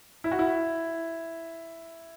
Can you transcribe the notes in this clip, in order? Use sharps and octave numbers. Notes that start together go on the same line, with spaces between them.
E4
F#4
E4